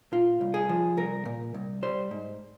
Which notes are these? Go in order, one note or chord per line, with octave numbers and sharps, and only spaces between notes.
A#2 F4
C2
G#4
F3
C2 A#4
A#2
C2
G3 C5
G#2